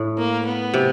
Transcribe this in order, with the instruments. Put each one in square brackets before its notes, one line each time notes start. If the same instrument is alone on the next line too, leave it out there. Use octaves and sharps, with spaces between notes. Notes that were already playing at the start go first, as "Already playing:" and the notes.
Already playing: [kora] A2
[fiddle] A#3
B3
[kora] C3